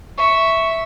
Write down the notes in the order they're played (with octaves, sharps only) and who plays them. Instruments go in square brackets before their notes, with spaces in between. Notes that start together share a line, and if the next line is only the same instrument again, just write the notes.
[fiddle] E5 [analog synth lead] C#6